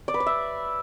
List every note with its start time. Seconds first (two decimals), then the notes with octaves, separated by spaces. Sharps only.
0.08 D5
0.14 B4
0.20 D5
0.26 E5